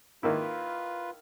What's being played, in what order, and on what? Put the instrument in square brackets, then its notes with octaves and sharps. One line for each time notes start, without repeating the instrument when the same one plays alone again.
[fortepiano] D#3 A#3 E4 [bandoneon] F4 B4